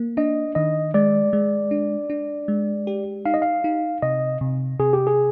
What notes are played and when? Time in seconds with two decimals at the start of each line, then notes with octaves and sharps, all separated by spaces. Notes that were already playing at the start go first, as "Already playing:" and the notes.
Already playing: A#3
0.17 D4 D#5
0.55 D#3 D#5
0.94 G#3 D5
1.33 G#3
1.71 D4
2.10 D4
2.48 G#3
2.87 G4
3.25 D#4 F5
3.34 D#5
3.42 F5
3.64 D#4
4.02 C3 D#5
4.41 C3
4.80 C3 G#4
4.93 G4
5.07 G#4